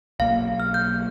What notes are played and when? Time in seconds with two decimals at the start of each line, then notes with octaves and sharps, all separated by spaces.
0.20 B1 A#3 F5
0.60 F6
0.74 G6